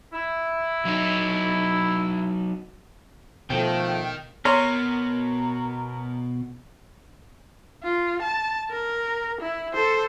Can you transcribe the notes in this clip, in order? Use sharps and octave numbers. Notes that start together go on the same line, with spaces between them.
E4
F#3 D#4
B2 D#3 F3 A3 G5
B2 A#4 C#5 C6
F4
A5
A#4
E4
A4 C5